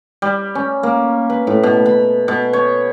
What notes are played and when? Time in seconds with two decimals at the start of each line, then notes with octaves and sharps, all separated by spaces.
0.22 G3
0.55 C#4
0.83 A#3
1.30 B4
1.47 A2
1.63 B2
1.86 B5
2.28 B2
2.53 C#5